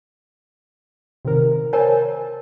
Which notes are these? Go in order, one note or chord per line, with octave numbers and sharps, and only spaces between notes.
C3 D#3 A#4
A#4 C5 C#5 G#5 A5